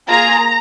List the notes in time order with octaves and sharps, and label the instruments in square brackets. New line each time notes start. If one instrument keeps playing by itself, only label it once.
[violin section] A#3 F4 G#4 A#5